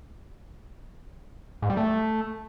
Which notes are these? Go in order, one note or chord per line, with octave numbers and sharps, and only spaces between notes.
G#2
G3
A3